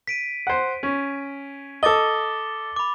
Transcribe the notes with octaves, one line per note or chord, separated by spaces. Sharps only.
B6 D7 D#7
C5 F#5
C#4
A4 D#5 D6 A6 G7
B5 D6